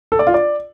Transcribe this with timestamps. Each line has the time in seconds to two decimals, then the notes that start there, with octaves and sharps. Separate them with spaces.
0.12 A4
0.19 D5
0.27 F4
0.34 D5